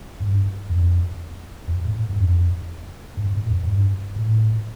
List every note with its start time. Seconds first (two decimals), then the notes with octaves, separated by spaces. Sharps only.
0.20 G2
0.70 F2
1.68 F2
1.85 A2
2.09 G2
2.18 F2
3.17 G2
3.34 A2
3.50 F2
3.65 G2
4.16 A2